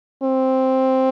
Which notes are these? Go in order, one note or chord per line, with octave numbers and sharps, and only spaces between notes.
C4